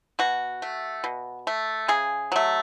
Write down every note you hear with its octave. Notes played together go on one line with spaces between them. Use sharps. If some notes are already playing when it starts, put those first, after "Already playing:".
B2 F#4
A3
B2
A3
C#3 G#4
F#3 A3